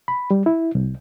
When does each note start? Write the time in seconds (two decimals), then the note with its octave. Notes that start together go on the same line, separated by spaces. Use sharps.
0.08 B5
0.31 G3
0.46 E4
0.75 C2